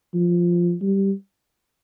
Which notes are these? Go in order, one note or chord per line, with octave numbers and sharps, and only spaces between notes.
F3
G3